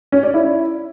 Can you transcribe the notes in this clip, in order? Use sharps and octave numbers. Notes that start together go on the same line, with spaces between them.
C#4
D5
E4